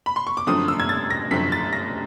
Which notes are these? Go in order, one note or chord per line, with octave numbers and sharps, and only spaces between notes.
B5
C6
C#6
D6
F#2 D3 F3 A3 C4 D#6
E6
G#6
A6
A#6
F#2 D3 F3 A3 C4 B6
A6
A#6